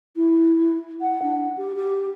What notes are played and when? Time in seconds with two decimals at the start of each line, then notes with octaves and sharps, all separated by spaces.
0.16 E4
1.01 F#5
1.22 D4
1.57 G4
1.76 G4